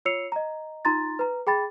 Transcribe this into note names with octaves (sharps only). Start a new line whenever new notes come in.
F4 C#5 E6 C7 C#7 F7
D#5 A#5
D#4 F4 A#5 C6 A6
B4 A#5
G#4 G5 B5 A6